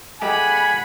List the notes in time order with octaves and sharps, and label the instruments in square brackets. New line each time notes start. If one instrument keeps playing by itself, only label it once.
[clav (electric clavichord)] G#3 A3 G4 [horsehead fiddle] F#5 B5 [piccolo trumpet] G#5